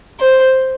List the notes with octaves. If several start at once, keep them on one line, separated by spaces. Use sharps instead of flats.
C5